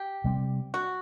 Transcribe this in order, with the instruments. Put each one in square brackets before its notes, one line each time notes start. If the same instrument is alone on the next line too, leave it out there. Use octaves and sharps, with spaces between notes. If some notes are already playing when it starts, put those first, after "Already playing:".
Already playing: [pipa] G4
[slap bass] C3 G3 C4
[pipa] F#4